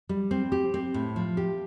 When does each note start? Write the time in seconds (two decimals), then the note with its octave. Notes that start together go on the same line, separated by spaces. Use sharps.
0.09 G3
0.31 C4
0.52 G4
0.74 C4
0.94 A2
1.16 F3
1.37 G4